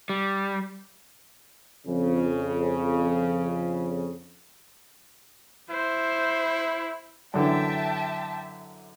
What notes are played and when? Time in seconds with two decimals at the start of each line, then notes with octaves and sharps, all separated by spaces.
0.09 G3
1.87 F2 C#3
5.70 E4 C5
7.34 F#2 D3 E3 E5 G5 A5